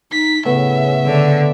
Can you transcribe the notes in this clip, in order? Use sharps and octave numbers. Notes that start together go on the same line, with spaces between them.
D#4 B6
A2 C#3 B3 E5
D3